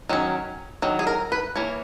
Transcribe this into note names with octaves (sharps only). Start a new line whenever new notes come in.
D#3 F#3 C#4
D#3 F#3
G#4
A#4
B4
E3 A#3 C#5